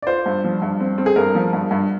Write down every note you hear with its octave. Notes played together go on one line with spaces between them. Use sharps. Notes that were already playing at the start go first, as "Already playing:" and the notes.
D5
F4 C5
G2
F3
G2
C4
C4
G#4
G2 A#4
F3
G2
G2